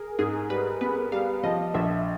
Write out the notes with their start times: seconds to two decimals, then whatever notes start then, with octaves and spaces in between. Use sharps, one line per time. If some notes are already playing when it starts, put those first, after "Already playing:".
Already playing: G#4 A#4
0.19 G#2 G#4
0.50 G3 B4
0.81 B3 B4
1.12 G3 F5
1.43 F3 D#5
1.74 A#1 E5